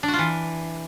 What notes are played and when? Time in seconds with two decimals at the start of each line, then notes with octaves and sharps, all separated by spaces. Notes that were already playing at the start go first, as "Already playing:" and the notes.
0.03 D4
0.08 F#4
0.13 F4
0.19 E3